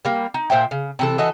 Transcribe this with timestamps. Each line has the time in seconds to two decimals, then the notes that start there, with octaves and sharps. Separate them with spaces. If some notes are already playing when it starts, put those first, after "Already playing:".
0.05 G3 A#3
0.34 D#4
0.50 A#2 C5 E5 G5
0.71 C#3
0.99 C3 E3 A4
1.18 E3 F#4 A4 D#5